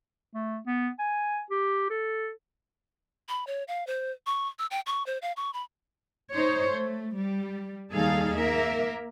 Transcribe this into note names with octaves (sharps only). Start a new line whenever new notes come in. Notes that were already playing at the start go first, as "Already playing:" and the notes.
A3
B3
G#5
G4
A4
B5
C#5
F5
C5
C#6
E6
G5
C#6
C5
F5
C#6
B5
D#4 C5 C#5
A3
G3
D#2 G3 D#4 G#4 A4 F5
A#3 A#4 E5